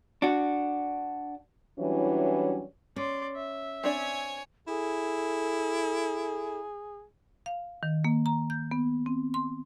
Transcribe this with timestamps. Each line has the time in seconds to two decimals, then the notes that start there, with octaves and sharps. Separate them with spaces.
0.22 D4 F#4
1.78 E3 F#3 G3 C#4 D4 E4
2.96 C#4 D5 C6
3.36 E5
3.84 C4 D4 C#5 D5 G#5
4.67 E4 G#4 A4
7.46 F5
7.83 D#3
8.05 A#3
8.26 A#5
8.50 G6
8.71 B3
9.06 C4
9.34 C6